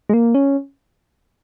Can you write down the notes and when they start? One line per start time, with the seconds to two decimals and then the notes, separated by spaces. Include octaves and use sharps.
0.09 G#3
0.13 A#3
0.35 C#4